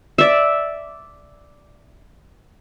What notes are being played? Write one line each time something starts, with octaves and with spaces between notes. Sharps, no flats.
D5 E5